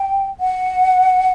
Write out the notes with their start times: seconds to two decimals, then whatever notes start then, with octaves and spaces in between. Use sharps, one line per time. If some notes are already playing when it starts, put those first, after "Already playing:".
Already playing: G5
0.40 F#5